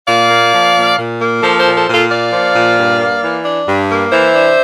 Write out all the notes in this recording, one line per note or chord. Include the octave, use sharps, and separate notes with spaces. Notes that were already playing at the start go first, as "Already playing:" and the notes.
A#2 D5 F5
A#3
F3
A#2
A#2
A#3
F3 A4 C5
A4 C5
A#2
A4 C5
A#2
F4 A4
A#3 D5 F5
F3
A#2
G2
A#3
E3
D4
G2
A#3
E3 C5 E5
D4